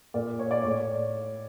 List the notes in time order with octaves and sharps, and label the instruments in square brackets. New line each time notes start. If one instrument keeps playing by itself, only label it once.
[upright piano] A#2 D5
C#5
D5
A2 C#5